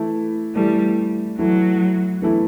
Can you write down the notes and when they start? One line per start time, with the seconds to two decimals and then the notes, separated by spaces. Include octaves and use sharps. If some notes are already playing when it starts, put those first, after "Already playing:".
Already playing: E3 A3 E4
0.56 E3 G3 A3 E4
1.39 E3 F#3 A3 E4
2.22 E3 A3 E4